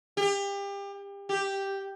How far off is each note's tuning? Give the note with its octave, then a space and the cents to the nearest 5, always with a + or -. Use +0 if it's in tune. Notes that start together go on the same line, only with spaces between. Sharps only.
G4 +30
G4 +0